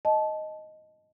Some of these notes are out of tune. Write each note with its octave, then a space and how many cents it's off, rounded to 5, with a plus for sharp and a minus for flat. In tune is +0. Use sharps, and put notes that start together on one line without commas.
D#5 +0 A5 -20